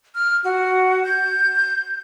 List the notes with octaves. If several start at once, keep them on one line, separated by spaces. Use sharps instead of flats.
F6
F#4
G6